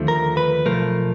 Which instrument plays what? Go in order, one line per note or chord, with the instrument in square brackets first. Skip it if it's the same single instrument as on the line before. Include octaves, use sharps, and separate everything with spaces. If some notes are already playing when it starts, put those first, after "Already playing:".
Already playing: [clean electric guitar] D#2 D3 F3 A3
A#4
B4
B1 A#2 F3 A3 A#4